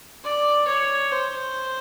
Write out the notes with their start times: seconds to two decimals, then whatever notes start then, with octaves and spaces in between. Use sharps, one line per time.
0.24 D5
0.67 C#5
1.11 C5